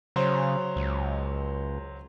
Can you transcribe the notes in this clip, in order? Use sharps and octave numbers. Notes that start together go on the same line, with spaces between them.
C#3 F#3 C5
C#2